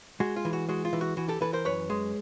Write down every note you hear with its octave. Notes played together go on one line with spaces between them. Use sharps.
G#3 F#4
F4
E3
F#4
G#3 F#4
F4
E3
F#4
E3 F#4
G4 A4
E3 A4 B4
A#4 C5
F#2 B4 C#5
G#3